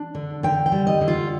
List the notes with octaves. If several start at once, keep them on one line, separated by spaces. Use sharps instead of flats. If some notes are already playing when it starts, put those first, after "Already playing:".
Already playing: D4
D3
D3 G5
G5
G3
D#5
D3
F4